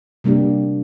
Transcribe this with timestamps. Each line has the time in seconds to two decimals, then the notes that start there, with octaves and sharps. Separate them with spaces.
0.24 C3 G3 A#3 D4 G4